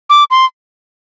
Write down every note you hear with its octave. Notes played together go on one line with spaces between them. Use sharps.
D6
C6